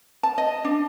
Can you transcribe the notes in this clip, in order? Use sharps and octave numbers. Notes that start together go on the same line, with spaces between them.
A5
D#5
D4